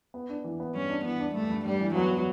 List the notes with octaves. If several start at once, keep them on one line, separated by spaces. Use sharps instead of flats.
B3
D4
E3
B3
G2 C#4
D4
E3 B3
D4
G2 A3
G2
G2 G3
E3
F#3 B3
B3